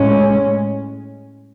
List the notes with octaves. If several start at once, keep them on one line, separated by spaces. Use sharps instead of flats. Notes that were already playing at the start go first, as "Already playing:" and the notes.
Already playing: A2 G#3 C#4